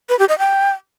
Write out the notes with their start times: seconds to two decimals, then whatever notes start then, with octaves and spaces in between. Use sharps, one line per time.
0.09 B4
0.19 G4
0.29 D#5
0.39 G5